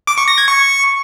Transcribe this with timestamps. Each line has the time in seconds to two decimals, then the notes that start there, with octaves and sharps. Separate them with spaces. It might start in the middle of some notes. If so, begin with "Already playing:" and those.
0.07 D6
0.18 C#6
0.28 A#6
0.38 G#6
0.48 C#6